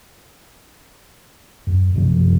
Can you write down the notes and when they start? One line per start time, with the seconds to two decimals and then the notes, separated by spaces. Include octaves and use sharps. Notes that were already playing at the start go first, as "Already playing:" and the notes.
1.67 F#2
1.95 B1 F#2 C3 F3